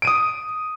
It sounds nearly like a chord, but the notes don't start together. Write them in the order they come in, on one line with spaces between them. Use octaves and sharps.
D7 D#7 D#6